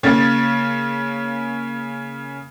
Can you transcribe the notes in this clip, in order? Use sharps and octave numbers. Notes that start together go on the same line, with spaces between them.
C#3 A#3 C#4 A6